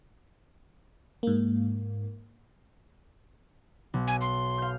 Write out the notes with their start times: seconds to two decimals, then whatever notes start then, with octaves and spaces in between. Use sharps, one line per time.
1.23 G#2 A#3
3.94 B1
4.07 G#5
4.21 C6
4.58 F5 G6